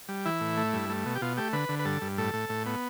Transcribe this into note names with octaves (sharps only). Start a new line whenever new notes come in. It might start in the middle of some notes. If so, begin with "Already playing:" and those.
G3
E3 E4
A2
A3
G2
A3
B2
G4
B2 F4
A3 G4
D3 B4
D3
B4
G2 A4
G2
A2 A4
A2
A2
B3